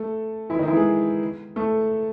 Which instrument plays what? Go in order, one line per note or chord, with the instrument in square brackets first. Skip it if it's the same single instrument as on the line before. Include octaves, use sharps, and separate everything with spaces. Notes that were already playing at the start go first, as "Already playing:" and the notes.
Already playing: [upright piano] A3 A4
E3 E4
D#3 D#4
E3 E4
G#3 G#4
A3 A4